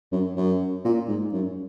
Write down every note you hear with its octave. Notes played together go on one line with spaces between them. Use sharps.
F#2
F#2
A#2
G#2
F#2